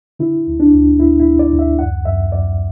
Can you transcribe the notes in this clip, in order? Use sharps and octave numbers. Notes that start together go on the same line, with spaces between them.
D3 E4
D2
D4
D2
D2 E4
E4
D2
D5
D2
E5
F#2 F#5
F#2 E5
F#2 D5